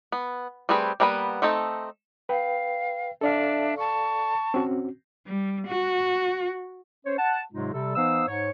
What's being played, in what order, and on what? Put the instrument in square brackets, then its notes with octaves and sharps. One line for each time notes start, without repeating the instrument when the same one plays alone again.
[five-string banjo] B3
G3 A3 C4 G#4 B4
G3 A#3 B3 G#4 B4
A3 C4 D#4 A4
[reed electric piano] B4 G5 [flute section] F5
[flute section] D4 E5 [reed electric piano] A4 D5 F5
[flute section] A5 C#6
[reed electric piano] C4 C#4 F#4
[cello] G3
F#4
[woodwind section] C#4 C5 C#5
F#5 A5
G#2 C3 F#3 G#3 D#4 F4
C3 G3 A4
E3 B3 D#4 C5 F5 E6
G#2 C#5